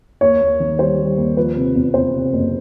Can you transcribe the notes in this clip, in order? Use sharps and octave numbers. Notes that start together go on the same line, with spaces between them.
D#2 C#5
D#2
D#3
G3 C5
G3
D#2
F3 B4
C3
E2
C3 C5
C3
F#1